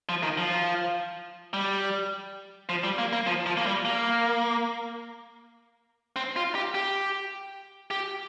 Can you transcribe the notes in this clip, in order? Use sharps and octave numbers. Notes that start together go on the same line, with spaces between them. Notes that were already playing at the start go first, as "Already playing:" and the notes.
F3
D#3
F3
G3
F3
G3
A#3
A#3
F3
F3
A#3
G3
A#3
C4
F4
G4
G4
G4